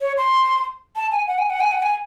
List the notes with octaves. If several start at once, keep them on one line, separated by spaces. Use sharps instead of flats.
C#5
C6
A5
G#5
F#5
G#5
F#5
G#5
F#5
G#5